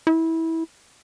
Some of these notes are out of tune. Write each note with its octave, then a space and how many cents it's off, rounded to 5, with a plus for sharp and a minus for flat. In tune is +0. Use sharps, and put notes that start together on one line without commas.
E4 -20